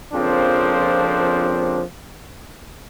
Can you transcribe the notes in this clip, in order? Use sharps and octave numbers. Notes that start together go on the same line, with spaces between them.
F2 C#3 F3 A#3 C4 D4